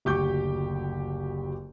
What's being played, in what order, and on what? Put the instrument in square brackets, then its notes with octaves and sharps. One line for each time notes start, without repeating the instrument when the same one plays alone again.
[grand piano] F#1 D2 G4 C#6 D6 G6